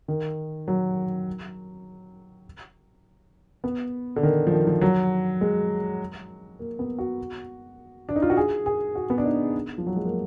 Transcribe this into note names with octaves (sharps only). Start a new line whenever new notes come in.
D#3
F#3
B3
D3
D#3
F3
D#3
F3
F#3
G#3
A#3
B3
F#4
D4
D#4
F4
F#4
G#4
G#4
F#4
B3
D4
D#4
F3
F#3
G#3
A#3